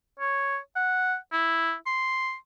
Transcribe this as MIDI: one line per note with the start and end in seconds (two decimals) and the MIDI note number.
0.20 0.57 73
0.76 1.16 78
1.32 1.74 64
1.86 2.35 84